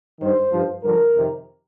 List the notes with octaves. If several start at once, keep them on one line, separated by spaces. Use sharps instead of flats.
G2 D#3 C5
G2 F3
G2 D3 F3 A#4
F2 C3 D#3